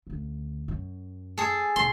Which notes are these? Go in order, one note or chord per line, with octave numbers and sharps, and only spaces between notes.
D2 C#3
F#2
G#4 A4
B1 F#2 C6